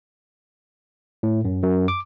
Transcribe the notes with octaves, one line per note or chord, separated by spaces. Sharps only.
A2
F#2
F#2
D6